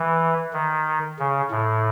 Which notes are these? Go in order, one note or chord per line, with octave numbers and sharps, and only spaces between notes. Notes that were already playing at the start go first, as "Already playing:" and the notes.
Already playing: E3
D#3
C#3
A2